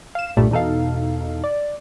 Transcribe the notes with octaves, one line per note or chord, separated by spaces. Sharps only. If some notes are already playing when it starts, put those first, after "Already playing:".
F5 E7
B1 G2 A#2 G3 A3
E2 B2 D#4 A4 F5
D5